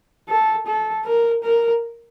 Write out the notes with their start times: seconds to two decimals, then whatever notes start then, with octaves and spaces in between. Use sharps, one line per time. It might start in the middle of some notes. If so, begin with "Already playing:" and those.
0.29 A4
0.67 A4
1.05 A#4
1.43 A#4